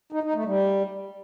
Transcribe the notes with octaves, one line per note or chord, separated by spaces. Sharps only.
D#4
D#4
A3
G3